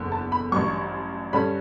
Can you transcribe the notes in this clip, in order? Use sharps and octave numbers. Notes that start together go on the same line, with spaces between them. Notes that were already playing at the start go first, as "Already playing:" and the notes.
Already playing: F#1 E2 D3
A5
B5
A1 G2 F#3 C#6
G2 D3 G3 C#4 B5